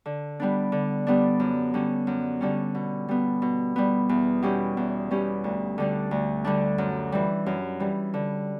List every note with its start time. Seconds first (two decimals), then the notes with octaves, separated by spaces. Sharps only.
0.06 D3
0.40 G3 B3 D4
0.72 D3
1.07 G3 B3 D4
1.40 F#2
1.74 D3 G3 C#4
2.07 F#2
2.41 D3 G3 C#4
2.75 B2
3.08 G3 B3
3.42 B2
3.76 G3 B3
4.09 E2
4.42 B2 G3 C#4 G4
4.77 E2
5.10 B2 G3 C#4 G4
5.44 D2
5.78 D3 G3 D4
6.11 D2
6.45 D3 G3 D4
6.78 F#2
7.12 E3 G3
7.46 F#2
7.80 E3 G3
8.14 D3